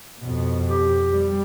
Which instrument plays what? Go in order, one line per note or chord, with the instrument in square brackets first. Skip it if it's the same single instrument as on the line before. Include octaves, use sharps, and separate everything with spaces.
[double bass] F2 B2
[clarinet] G4
[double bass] G3